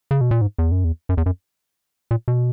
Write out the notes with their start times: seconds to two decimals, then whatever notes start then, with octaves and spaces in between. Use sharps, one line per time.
0.11 C#3
0.21 B2
0.31 A#2
0.41 G#2
0.58 E2
0.72 F#2
0.84 E2
1.09 F#2
1.17 E2
1.26 F#2
2.11 A#2
2.28 B2